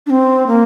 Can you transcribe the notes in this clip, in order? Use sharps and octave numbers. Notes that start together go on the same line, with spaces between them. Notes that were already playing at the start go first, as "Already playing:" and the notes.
D4
C4
A#3